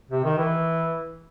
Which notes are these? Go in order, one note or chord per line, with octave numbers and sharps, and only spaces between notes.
C3
D#3
E3